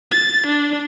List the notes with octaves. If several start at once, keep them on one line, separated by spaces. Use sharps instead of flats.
A6
D4